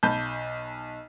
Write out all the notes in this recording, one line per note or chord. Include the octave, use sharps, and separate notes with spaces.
B1 A5 B5 G6